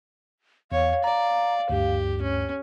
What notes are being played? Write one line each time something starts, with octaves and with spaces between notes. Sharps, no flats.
E2 C#5 F5
D5 A#5
D2 G2 G4
C#4